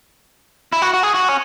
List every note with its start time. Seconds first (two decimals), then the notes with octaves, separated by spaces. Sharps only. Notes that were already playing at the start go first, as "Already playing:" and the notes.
0.73 E4
0.82 F#4
0.94 F#4
1.03 G#4
1.14 F#4
1.29 C#4